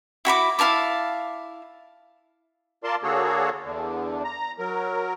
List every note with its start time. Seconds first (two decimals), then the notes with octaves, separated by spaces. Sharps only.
0.25 E4 F#4 B5 D6
0.59 E4 F5 A5 D6
2.84 F4 A#4 D5 A5 C6
3.03 D3 A#3 F#4 G#4 A4 C#5
3.64 E2 D3
4.25 A#5
4.59 F#3 A#4